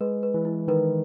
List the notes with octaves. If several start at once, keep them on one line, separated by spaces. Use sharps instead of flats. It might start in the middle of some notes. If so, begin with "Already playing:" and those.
G#3 B4
B4
E3
E4
D#3 B4